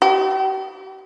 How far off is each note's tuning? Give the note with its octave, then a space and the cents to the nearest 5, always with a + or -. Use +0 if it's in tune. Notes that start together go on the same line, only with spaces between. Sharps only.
G4 -40